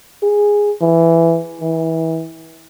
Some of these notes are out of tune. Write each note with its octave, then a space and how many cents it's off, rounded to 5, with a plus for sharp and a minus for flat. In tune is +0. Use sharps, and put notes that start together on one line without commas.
G#4 -5
E3 +10
E3 -25